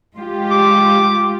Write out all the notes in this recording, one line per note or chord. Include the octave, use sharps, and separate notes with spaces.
G#3 F4 G4
D6